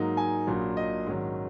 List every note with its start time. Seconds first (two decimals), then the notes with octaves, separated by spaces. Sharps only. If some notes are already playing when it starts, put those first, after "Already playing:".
Already playing: G#2 F#3 A#3 D#4
0.17 G#5
0.47 A#1 A#2 F#3
0.77 D#5
1.06 G#2 D#3 F#3 C#4